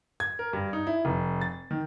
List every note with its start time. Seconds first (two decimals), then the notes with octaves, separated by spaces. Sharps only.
0.20 G#6
0.39 A#4
0.53 G2
0.73 D#4
0.87 E4
1.05 F1
1.41 A6
1.71 D#3